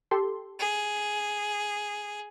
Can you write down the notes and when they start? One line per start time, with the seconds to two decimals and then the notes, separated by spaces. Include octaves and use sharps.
0.11 G4 A4 C6
0.59 G#4